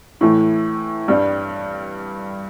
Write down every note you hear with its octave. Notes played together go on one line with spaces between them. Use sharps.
A2 E3 A3
G2 G3 D4